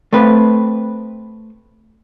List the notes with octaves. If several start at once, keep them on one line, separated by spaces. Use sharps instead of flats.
A3 C4 B4